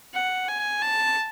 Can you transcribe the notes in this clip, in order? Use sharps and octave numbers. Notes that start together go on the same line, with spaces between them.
F#5
G#5
A5